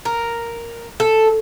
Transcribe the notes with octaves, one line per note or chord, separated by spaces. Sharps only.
A#4
A4